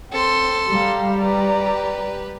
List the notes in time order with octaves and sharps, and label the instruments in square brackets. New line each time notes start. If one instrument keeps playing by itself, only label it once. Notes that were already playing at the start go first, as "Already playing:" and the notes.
[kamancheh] C4 [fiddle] A4 C6
[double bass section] G3 [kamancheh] F5 A#5
[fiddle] G4 B4 [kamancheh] D5 A#5